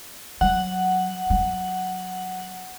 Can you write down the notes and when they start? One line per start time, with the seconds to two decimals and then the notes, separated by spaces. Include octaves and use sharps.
0.41 F#3 F#5
1.30 F#3